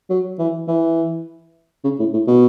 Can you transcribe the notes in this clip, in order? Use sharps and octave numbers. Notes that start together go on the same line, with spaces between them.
F#3
E3
E3
C#3
A2
A2
B2